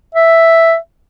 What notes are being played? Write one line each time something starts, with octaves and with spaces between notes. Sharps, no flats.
E5